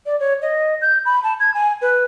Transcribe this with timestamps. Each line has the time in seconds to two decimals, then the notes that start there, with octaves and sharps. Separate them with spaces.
0.06 D5
0.20 C#5
0.42 D#5
0.82 G6
1.05 B5
1.24 A5
1.40 G#6
1.54 G#5
1.82 B4